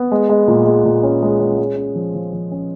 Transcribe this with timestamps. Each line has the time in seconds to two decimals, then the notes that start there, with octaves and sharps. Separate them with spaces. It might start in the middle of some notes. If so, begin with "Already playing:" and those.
Already playing: B3
0.12 G#3
0.29 G#3
0.48 A#2
0.66 G#3
0.85 A#2
1.03 C#4
1.23 G#3
1.40 C#4
1.59 G#3
1.77 C#4
1.95 F3
2.14 F3
2.33 F3
2.52 C#4